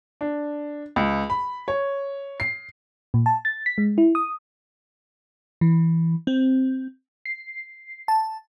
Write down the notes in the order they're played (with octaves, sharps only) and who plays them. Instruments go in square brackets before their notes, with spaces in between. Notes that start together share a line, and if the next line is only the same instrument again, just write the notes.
[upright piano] D4
C#2
B5
C#5
C7
[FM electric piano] A#2
A5
A6
B6
G#3
E4
D#6
E3
C4
C7
A5